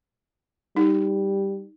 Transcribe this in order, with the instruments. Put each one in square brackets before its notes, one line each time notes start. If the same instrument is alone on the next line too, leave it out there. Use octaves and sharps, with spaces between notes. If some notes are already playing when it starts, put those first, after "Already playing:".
[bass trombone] G3 [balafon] D#4